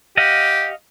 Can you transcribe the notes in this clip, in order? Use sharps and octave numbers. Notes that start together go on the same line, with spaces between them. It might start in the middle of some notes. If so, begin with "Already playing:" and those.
G4 D#5 F5 F#5